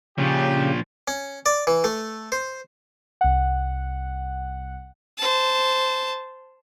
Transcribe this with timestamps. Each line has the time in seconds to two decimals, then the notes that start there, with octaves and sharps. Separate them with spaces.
0.18 A#2 C#3 F3 G4
1.08 C#4
1.46 D5
1.67 E3
1.84 A3
2.32 C5
3.21 C2 F#5
5.18 C5 A5